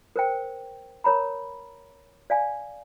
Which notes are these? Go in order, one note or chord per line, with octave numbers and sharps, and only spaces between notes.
A#4 C5 G5
A#4 C#5 A#5 B5
D5 F5 G#5